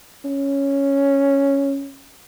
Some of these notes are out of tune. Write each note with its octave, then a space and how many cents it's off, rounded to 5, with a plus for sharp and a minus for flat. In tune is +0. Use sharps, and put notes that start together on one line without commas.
C#4 +0